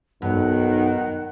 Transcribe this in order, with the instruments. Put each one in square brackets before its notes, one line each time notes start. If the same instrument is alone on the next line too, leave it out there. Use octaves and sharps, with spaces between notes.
[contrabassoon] B1 [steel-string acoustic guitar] G2 [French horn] D#3 [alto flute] F#5